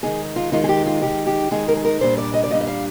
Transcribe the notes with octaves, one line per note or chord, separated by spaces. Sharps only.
D#3 G#3 D#4 G#4
F4
D#3 G#3 D#4 F4
G#4
G4
F4
D#3 G#3 D#4 G4
G4
D#3 G#3 D#4 G#4
A#4
G#4
A#4
A#2 G3 D4 C5
D5
D#5
D5
A#2 G3 D4 D#5
D#5
F5